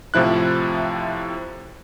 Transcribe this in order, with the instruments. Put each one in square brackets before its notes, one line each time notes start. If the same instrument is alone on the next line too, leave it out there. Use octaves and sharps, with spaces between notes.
[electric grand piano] A2 C3 F3 E4 F#6